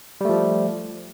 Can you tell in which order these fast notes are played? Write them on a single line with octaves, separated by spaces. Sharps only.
G3 A3 F3